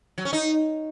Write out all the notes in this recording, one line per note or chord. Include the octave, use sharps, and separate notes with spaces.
F#3
C#4
D#4